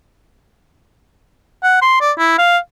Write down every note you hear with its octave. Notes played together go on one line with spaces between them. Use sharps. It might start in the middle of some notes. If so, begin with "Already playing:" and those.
F#5
C6
D5
E4
F5